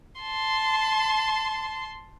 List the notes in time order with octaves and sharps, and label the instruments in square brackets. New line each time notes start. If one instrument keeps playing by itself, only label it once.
[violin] A5 C6